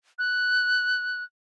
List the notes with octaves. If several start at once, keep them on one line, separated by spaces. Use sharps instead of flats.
F#6